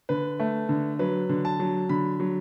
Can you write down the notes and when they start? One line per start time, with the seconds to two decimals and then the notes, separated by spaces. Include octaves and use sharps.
0.09 D3 B4
0.40 A3
0.69 D3
0.99 F#3 B4
1.29 D3
1.45 A5
1.60 F#3
1.89 D3 B5
2.20 F#3